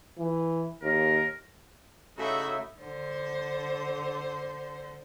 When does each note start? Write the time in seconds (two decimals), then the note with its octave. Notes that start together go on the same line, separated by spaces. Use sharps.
0.18 E3
0.82 D#2 A#4
2.18 C#3 A3 D#4 E4 F#4 E5
2.80 D3 C5